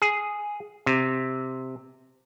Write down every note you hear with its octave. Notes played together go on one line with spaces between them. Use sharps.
G#4
C3